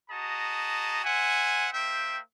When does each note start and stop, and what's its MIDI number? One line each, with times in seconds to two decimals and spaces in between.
0.10 1.02 66
0.10 1.02 68
0.10 1.02 75
0.10 1.02 81
0.10 1.02 82
1.04 1.68 72
1.04 1.68 76
1.04 1.68 78
1.04 1.68 80
1.73 2.19 58
1.73 2.19 72
1.73 2.19 76
1.73 2.19 79